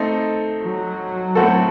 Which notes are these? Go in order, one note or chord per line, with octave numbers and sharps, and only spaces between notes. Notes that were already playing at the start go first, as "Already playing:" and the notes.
Already playing: A3 C4 D#4 A4
F#3
A2 A3 C4 F#4 A4